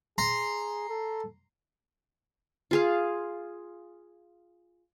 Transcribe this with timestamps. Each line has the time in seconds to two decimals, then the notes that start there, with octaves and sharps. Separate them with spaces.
0.18 G#4 A#5 C6
0.90 A4
2.71 F4 G#4 F5